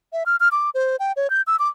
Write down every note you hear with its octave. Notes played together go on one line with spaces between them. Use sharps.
E5
F6
F6
D6
C5
G5
C#5
G6
E6
D6